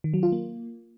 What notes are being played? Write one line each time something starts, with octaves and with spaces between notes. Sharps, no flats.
D#3
F#3
F4
A#3